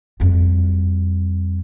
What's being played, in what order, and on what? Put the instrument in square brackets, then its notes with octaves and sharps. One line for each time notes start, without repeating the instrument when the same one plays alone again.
[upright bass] F2 G3